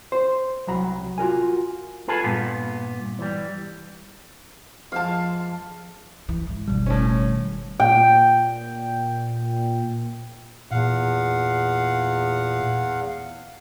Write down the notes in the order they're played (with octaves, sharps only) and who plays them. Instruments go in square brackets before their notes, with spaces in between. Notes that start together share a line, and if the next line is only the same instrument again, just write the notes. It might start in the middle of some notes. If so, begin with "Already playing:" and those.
[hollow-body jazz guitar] C5
C2 F#3 A#5 B5
F4 F#4 A#4 G#5
[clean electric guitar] F4 G#4 A4 B4
G2 A#2 B3
E3 G3
[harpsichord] F2 G#3 D6 [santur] F5 A5
[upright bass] E3
G#2
[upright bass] F#1 D#3 [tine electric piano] B2 G3
[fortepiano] A2 C#4
[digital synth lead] A#2 [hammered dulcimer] G5
[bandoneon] E2 F5 F#5 [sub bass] A#2